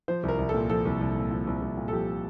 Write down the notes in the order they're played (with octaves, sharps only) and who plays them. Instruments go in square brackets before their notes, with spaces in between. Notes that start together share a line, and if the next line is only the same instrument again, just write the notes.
[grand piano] F3 C5
C2
A#4
C2
A4
A#2
F3 A4
C2
C2
A#2
F3
C2
C2
A#2
A4
F3 G4